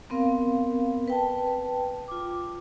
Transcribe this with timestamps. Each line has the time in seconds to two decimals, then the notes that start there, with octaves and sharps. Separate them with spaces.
0.10 B3 C4 A#4 F5
1.08 B4 G5 A5
2.08 F4 D6